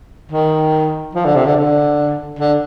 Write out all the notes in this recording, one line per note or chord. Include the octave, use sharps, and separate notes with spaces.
D#3
F3
D3
C3
D3
D3
D3